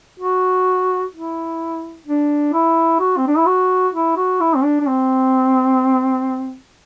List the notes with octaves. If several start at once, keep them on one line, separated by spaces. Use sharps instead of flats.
F#4
E4
D4
E4
F#4
C4
D4
E4
F#4
E4
F#4
E4
C4
D4
D4
C4